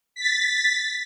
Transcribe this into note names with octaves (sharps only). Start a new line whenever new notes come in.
A6 B6